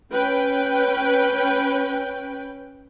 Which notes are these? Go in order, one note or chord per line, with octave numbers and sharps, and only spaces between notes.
C#4 B4 G5